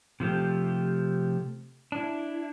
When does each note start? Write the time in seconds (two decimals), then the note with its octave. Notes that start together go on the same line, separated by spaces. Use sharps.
0.20 C3 F3 A3 G4
1.92 D4 E4